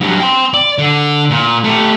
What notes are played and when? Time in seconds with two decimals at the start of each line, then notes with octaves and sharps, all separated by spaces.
0.01 G2 F#3
0.20 G5 C6
0.53 D5
0.78 D3
1.31 A#2
1.64 A3 G4